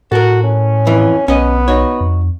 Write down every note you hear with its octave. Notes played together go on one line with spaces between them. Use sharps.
A2 F#4 A4 A#4
C#4
F2 E3
B1 B3 C#4 D#5
D#4 F#4 C#5
F2